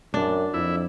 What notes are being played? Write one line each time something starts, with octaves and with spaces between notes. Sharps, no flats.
F#2 D4
F2 E4